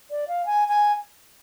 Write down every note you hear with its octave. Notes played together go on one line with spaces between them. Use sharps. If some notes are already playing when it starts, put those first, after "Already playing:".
D5
F5
G#5
G#5